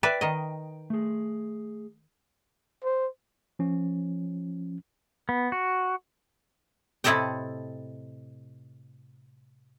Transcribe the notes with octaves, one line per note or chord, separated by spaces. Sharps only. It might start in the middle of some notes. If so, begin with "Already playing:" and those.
B4 D5 E5 G5
D#3 D#5
A3 G#4
C5
F3 C#4
B3
F#4
A2 C3 E4 A4 D#5 G5